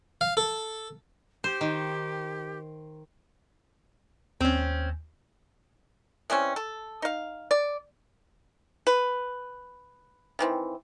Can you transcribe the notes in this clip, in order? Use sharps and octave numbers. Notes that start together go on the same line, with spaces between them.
F5
A4
G4 C5
D#3
D#2 C4 C#4
E3 G3 C4 C#4
A4
D#4 F5
D5
B4
D#3 E3 C4